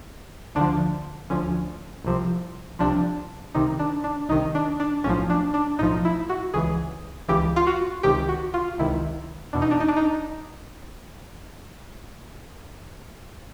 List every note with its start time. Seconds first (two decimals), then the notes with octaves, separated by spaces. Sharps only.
0.55 D2 D3 F3 D4
1.30 D2 D3 F3 C#4
2.05 C2 C3 F3
2.79 C2 C3 F3 D4
3.55 C2 C3 D#3 D#4
3.79 D4
4.04 D4
4.29 C2 C3 D#3 D#4
4.55 D4
4.80 D4
5.04 B1 A2 F3 C#4
5.30 D4
5.54 D4
5.79 B1 A2 F3 D#4
6.05 E4
6.29 F#4
6.54 C#2 C#3 E3 G#4
7.28 C#2 C#3 E3 G4
7.56 F4
7.67 F#4
8.03 C#2 C3 D#3 G4
8.29 F#4
8.54 F4
8.78 C#2 C3 D#3 E4
9.53 E2 B2 D4
9.62 D#4
9.71 D4
9.80 D#4
9.89 D4
9.96 D#4